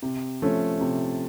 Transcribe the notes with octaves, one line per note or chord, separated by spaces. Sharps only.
C3
F3 A3 C#4
C3